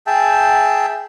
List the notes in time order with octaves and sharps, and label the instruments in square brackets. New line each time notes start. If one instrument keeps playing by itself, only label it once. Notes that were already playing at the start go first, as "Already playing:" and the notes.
[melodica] G#4 E5 G5 A5